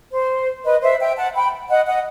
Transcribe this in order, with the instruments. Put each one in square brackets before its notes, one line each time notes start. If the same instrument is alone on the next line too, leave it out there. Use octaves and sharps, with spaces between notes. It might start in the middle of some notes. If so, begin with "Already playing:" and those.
[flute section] C5
B4 D#5
C5 E5
E5 G5
F#5 A5
G5 B5
D#5 F#5
D#5 F#5